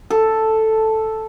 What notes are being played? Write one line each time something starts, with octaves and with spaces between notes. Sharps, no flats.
A4